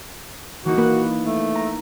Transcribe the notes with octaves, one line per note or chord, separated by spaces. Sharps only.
E3 A#3 D#4 F#4
A#3 B4 F#6
A3
A#5